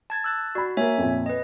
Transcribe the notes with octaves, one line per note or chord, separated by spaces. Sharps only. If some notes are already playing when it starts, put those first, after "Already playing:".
A5 G#6 A6
E6 F#6 A6
F#4 D5 B5
A#3 A#4 C#5 E5 G#5
F2 A#2
B4 D#5